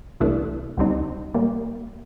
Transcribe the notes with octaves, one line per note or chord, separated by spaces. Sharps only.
C2 C3 E3 A3 D4
C#2 B2 G3 C4 D#4
A#2 G3 A#3